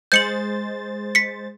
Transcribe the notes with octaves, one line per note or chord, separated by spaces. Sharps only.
G#3 C5 G6 A6 C#7 F#7
B6 C#7